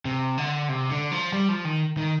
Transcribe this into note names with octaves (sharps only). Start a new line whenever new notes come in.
C3
D3
C3
D3
F3
G3
F3
D#3
D#3